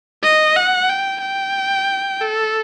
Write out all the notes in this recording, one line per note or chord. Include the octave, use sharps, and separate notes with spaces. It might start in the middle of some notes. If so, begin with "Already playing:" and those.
D#5
F#5
G5
G5
A4